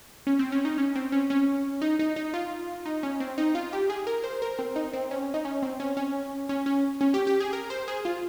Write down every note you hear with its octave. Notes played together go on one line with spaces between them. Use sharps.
C#4
C4
C#4
D#4
C#4
C4
C#4
C#4
D#4
D#4
D#4
F4
D#4
C#4
C4
D#4
F4
G4
G#4
A#4
C5
A#4
C4
D#4
C4
C#4
D#4
C#4
C4
C#4
C#4
C#4
C#4
C#4
G4
G4
G#4
A#4
C5
G#4
F4